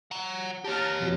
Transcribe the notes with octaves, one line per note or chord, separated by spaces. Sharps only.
F#5 A#5
G4 C#5 A5 A#5 F6
F2 B2